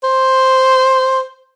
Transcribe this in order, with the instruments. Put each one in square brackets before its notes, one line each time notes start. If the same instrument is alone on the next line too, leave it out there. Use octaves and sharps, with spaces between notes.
[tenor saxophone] C5